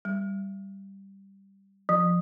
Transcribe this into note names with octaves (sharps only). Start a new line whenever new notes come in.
G3
F3